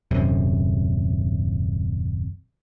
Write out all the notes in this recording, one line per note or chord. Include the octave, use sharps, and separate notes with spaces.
D#1 F#2 C3